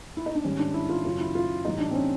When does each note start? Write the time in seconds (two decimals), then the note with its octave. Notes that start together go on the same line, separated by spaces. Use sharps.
0.17 E4
0.26 D#4
0.35 D4
0.44 G#2 D#3 G3 C#4
0.59 D4
0.74 E4
0.89 F4
1.05 F#2 C#3 F#3 F4
1.20 E4
1.35 F4
1.65 A2 E3 G3 D#4
1.80 D4
1.91 C4
1.95 C#4